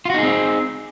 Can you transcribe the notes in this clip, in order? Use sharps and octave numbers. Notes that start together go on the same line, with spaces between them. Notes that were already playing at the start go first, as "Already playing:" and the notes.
C4 D#4 F4 F#4 G#4